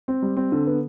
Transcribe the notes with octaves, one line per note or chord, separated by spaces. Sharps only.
C4
G3
C4
D3
B3